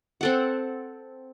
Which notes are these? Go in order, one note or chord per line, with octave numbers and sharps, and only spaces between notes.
C4 A4 F#5